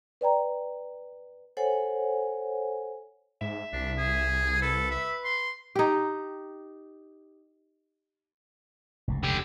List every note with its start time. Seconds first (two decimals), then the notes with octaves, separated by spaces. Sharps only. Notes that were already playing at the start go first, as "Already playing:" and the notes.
0.21 B4 D5 G5 A#5
1.57 A4 C5 C#5 F#5 G#5
3.41 G#2 E5
3.73 C2 D4
3.98 G#4
4.62 A4 B4
4.91 E5
5.24 C6
5.75 D#4 G4
9.08 F1 C#2 G2
9.23 D3 G4